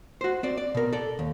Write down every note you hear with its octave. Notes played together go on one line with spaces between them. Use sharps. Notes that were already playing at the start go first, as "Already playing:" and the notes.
F#4 C5
C4 D5
D5
B2 A#4
A4 D5
D#2